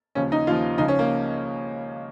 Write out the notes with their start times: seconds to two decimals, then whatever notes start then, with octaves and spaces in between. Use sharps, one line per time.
0.15 D#2 C#3 F3 C#4
0.32 D#4
0.47 D#2 C#3 F3 F4
0.78 C#2 C#3 F3 D#4
0.88 C#4
0.99 A#3